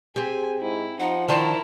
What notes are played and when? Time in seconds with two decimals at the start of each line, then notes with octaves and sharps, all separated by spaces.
0.16 C4 G4 G#4 G#5
0.61 G#2 E4
1.00 F3 D#4 F#5
1.28 D#3 D4 E4 A#4 C5 A5